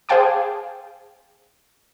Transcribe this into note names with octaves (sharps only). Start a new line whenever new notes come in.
G#4 C5 F5 G5 A5 D6